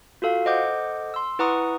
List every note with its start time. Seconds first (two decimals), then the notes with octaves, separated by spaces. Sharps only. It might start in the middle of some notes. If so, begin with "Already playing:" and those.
0.22 F4 F#4 A4 F5
0.45 A4 C5 D#5 F#5 D6 G6
1.14 C6 E6
1.39 E4 B4 F#5 A#5 C#6 D#6